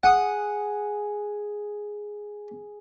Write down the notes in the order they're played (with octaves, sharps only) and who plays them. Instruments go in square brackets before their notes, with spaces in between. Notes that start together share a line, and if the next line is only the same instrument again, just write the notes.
[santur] G#4 [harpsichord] F#5 D#6